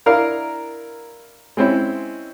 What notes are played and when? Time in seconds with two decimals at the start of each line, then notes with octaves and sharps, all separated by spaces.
0.06 D4 E4 A#4 F5
1.57 G#3 C4 C#4 E4